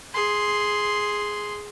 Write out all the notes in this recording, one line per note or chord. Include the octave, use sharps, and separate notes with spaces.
G#4 C6